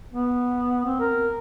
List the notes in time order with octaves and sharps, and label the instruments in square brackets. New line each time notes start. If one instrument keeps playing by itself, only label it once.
[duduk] B3
C4
A#4